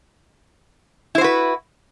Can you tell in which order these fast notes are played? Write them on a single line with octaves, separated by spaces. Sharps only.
E4 C5 F#4 B4